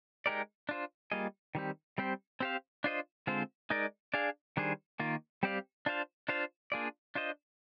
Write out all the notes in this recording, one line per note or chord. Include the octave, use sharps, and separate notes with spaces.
G#3 D#4 G4 A#4 D5
D4 F4 C5
G3 A#3 F4 G#4 D#5
D#3 G3 C4 G4
G3 C4 G4 C5
C4 G4 C5 F5
D4 F4 C5 D#5
D3 G#3 C4 F4 C5
G#3 D#4 A#4 D5
D4 G#4 D5 F5
D#3 G3 D4 G#4 C5
D#3 A#3 F4
G3 C4 G4 D5 F5
D4 F4 C5 F5
D4 F4 C5 F5
A#3 D4 F4 G#4 D5
D4 F4 C5 D#5